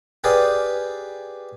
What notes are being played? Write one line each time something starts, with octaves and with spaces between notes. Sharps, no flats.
G4 G#4 B4 D5 F5 G5